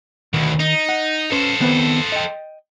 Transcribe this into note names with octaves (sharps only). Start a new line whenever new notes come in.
D2 B2 D#3
D#4
F#5
C#4 A4 B4 C5
D#3 B3 C4
D#5 G5